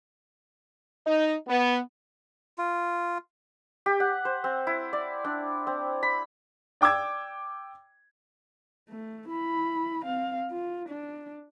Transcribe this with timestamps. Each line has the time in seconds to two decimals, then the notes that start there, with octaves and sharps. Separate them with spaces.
1.07 D#4
1.48 B3
2.58 F4
3.86 G4
4.00 F#5
4.25 C5
4.44 C4
4.67 E4
4.93 D5
5.25 D4
5.67 C4
6.03 B5
6.81 D5 G5 D6 E6 G#6
8.89 A3
9.29 E4 B5
10.05 C4 F5
10.51 F4
10.89 D4